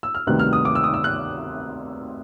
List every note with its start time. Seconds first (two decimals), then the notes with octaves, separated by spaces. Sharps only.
0.03 E6
0.15 F6
0.27 D2 C3 D#3 G3 B3 F#6
0.39 F6
0.53 D#6
0.65 D6
0.75 E6
0.84 D#6
0.94 E6
1.04 F#6